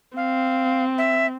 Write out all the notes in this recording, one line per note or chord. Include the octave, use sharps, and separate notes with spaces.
C4 F5
E5